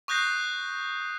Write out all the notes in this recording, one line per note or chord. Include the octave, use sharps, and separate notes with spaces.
C#6 D#6 F#6 G6 A#6 C7